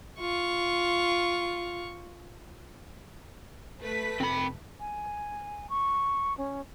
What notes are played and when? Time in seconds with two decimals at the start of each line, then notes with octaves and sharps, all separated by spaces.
0.20 F4 C#6
3.80 A3 B4 B6
4.21 F1 C4 B5
4.80 G#5
5.69 C#6
6.38 C#4